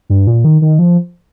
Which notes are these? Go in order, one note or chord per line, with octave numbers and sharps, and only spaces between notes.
G2
A#2
D#3
D#3
F3